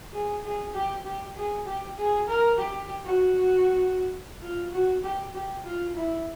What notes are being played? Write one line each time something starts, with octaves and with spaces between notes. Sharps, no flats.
G#4
G#4
G4
G4
G#4
G4
G#4
A#4
G4
F#4
F4
F#4
G4
G4
F4
E4